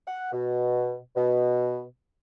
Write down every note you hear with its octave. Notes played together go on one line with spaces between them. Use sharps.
F#5
B2
B2